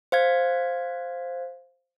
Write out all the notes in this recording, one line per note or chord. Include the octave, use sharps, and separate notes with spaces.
C5 F5 G#6